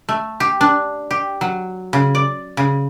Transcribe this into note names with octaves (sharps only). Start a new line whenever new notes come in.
A3
G4
D4
G4
F#3
C#3
D5
C#3